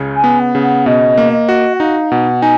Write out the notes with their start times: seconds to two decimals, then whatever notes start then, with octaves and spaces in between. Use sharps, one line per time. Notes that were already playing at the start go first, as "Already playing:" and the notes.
Already playing: C#2 C#3
0.16 G#5
0.24 B3
0.40 F#5
0.55 C#3
0.62 F#5
0.86 B2 D#5
1.18 A#3
1.32 D#5
1.49 F#4
1.74 F#5
1.80 D#4 F5
2.11 B2 F#5
2.42 D#4 G#5